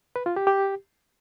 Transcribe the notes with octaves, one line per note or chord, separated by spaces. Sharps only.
B4
F4
G4
G4